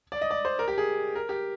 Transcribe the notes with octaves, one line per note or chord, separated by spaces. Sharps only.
D5
D#5
D5
C5
A#4
G4
G#4
A#4
G4